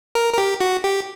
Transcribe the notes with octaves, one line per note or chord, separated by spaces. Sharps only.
A#4
A#4
G4
F#4
G4